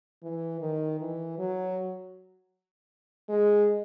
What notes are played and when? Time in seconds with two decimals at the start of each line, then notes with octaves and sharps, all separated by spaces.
0.23 E3
0.61 D#3
1.00 E3
1.39 F#3
3.29 G#3